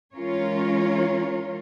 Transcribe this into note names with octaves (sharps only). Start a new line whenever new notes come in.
E3 G#3 C#4 F4 A#4 C#5